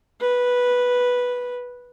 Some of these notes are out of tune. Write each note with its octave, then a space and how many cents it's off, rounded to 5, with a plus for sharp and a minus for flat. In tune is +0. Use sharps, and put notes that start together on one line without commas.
B4 -5